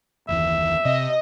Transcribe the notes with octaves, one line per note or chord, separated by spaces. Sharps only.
F#1 D#2 E3 E5
C3 C4 D#5